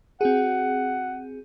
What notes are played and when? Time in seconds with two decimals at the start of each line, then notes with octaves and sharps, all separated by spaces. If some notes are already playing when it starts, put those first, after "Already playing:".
0.21 C4 F#4 G#4 F#5